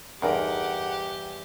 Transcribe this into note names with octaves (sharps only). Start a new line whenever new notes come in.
E2 G2 D#4 G4 G#4 A#4 F#5